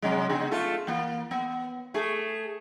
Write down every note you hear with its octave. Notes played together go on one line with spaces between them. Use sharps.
C3 F#3 G#3
C#3 B3 G#4
A3 F4 A4
E3 A#3
B3
A3 G#4